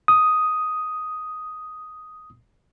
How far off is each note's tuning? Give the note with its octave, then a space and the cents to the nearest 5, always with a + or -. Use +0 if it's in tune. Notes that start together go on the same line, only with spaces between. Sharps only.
D#6 +5